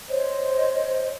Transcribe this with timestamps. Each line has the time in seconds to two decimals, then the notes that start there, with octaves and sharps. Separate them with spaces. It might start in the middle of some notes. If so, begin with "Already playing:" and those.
0.09 C5 C#5 D#5